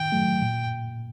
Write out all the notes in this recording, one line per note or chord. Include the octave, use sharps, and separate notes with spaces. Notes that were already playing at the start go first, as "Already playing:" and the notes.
Already playing: D#3 G5
F#3 A3
A#2